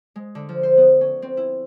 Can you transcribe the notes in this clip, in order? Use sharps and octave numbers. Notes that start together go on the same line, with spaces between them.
G#3
D3
F3
C5
B3
C#4
C4
E4